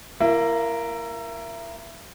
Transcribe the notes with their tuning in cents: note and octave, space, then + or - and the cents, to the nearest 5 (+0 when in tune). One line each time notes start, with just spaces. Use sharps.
A#3 +0 E4 +30